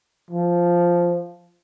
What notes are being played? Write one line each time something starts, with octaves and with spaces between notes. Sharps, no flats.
F3